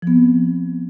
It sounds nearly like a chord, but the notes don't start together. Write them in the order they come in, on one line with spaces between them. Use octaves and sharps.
F3 B3 C4